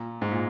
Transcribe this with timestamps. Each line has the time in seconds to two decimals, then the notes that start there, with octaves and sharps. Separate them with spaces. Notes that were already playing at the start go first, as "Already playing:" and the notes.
Already playing: A#2
0.22 G#2
0.32 A#2